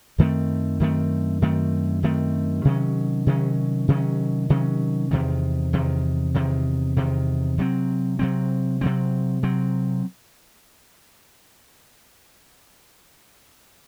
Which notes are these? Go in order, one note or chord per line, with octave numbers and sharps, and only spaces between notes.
F#2 D#3 A3 C4
F#2 D#3 A3 C4
F#2 D#3 A3 C4
F#2 D#3 A3 C4
C3 D#3 F#3 C#4
C3 D#3 F#3 C#4
C3 D#3 F#3 C#4
C3 D#3 F#3 C#4
E2 C3 D#3
E2 C3 D#3
E2 C3 D#3
E2 C3 D#3
C3 F#3 C4
C3 F#3 C4
C3 F#3 C4
C3 F#3 C4